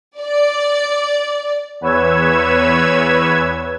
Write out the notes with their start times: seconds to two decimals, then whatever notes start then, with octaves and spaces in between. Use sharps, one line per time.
0.19 D5
1.81 E2 B4 C#5 E6 G#6